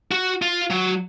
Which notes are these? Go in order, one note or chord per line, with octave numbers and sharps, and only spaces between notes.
F#4
F4
F#3